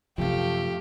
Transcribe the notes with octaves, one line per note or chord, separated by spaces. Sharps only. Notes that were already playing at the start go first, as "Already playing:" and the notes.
F#2 C3 F3 A3 G4 F5